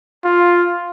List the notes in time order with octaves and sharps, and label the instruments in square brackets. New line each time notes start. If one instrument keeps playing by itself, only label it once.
[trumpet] F4